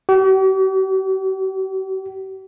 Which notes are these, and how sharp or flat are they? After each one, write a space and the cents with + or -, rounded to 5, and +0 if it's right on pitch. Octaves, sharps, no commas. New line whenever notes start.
G4 -45